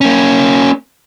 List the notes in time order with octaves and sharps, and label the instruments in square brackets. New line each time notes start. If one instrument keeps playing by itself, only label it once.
[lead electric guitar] A#3 C#4